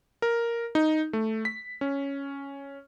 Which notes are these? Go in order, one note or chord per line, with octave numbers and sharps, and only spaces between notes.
A#4
D#4
A3
B6
C#4